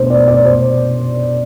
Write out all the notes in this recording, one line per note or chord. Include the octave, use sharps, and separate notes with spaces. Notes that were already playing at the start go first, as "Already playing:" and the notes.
Already playing: B2 B3 D4 C5
D5
D5
C5